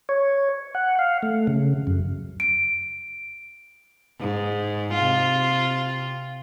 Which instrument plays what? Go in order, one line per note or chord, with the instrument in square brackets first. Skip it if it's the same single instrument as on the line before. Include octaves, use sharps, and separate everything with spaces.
[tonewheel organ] C#5
F#5
F5
A3
C#3
F#2
[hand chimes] D7
[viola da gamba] G#2
C3 F4